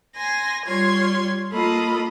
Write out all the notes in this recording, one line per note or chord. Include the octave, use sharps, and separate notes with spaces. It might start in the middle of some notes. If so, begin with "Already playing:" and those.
G#5 C6 A#6
G3 F4 C#5 C6 G#6
A#3 F4 A4 D#5 B5